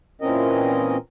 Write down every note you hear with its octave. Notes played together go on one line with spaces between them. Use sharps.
A#2 E3 C4 C#4 A#4 D#5